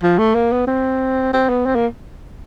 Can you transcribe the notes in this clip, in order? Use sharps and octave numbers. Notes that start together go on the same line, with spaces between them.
F3
A3
A#3
B3
C4
C4
B3
C4
A#3